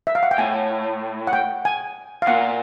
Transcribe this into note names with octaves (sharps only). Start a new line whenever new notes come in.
E5
F5
F#5
G5
A2 G#5
F#5
G5
G#5
F5
A#2 F#5